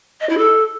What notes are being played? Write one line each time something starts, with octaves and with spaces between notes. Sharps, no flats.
D#5
E4
A4